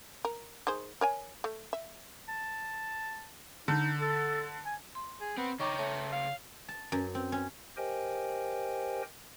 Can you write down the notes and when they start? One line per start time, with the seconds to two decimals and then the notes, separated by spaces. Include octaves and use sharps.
0.25 A#4
0.67 D#3 G#4 C5
1.01 A#4 C#5 G#5
1.44 A3
1.73 E5
2.29 A5
3.68 D3 D#4
4.01 A4
4.66 G#5
4.95 C6
5.21 G#4
5.37 B3 C4
5.59 C#3 D#4 C#5 G5 A#5 C#6 D6
5.78 A3 C#5
6.12 F5
6.68 A5
6.92 F#2
7.15 C4
7.32 C#4
7.77 G4 A#4 C5 D#5 G5 G#5